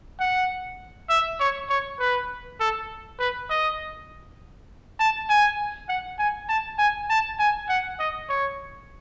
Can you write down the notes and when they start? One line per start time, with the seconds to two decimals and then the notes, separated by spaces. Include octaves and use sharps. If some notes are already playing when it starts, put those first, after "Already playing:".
0.20 F#5
1.09 E5
1.40 C#5
1.70 C#5
2.00 B4
2.60 A4
3.20 B4
3.50 D#5
5.00 A5
5.30 G#5
5.89 F#5
6.19 G#5
6.49 A5
6.79 G#5
7.10 A5
7.39 G#5
7.69 F#5
8.00 D#5
8.29 C#5